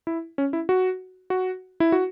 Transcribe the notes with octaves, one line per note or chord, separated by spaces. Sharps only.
E4
C#4
E4
F#4
F#4
E4
F#4